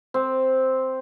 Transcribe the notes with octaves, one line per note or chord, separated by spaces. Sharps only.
C4